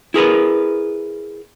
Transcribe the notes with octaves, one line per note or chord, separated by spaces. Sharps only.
E4 G#4 A#4 B4